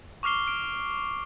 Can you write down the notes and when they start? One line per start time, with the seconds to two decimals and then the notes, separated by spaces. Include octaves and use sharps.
0.23 C#6 D6 F6 C7 G7
0.47 F6 D7